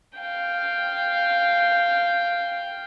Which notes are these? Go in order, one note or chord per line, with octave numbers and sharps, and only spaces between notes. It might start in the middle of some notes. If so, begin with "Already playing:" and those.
F5 G5